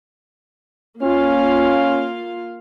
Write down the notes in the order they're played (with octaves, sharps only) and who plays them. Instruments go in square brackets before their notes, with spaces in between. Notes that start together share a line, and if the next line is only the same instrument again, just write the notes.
[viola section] A#3 F4 F5 [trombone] C#4